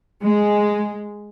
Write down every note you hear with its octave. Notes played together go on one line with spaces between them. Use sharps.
G#3